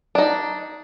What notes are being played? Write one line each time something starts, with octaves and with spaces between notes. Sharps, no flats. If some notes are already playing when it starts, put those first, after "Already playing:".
D4 D#4